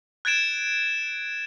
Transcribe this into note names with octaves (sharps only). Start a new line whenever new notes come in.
F#6 G#6 A6 D7 E7